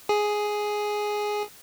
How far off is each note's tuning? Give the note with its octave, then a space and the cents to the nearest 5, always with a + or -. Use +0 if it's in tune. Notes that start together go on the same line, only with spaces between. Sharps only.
G#4 +5